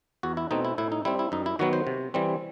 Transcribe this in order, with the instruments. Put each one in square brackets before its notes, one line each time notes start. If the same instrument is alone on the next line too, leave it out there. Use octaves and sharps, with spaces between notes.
[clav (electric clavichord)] E2 F#4
E4
B2 A3 C4 D#4
E4
A2 E4
D#4
G3 C4 E4
E4
F#2 D#4
E4
D#3 F#3 B3 F#4
C5
C3
E3 G3 C4